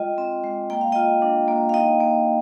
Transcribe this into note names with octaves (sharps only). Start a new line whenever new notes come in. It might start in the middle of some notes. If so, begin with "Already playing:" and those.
Already playing: G#3 F4 D#5 G5
C4
G#3
A#3 G5
F5
F4 D#5 G5
D4
A#3
F5
D#4 D#5 G5
A#3